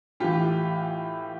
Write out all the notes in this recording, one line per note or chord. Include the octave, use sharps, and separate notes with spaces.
A2 E3 F4 G4